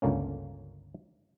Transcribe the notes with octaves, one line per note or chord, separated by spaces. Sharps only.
G1 C#2 D3 A#3 C#4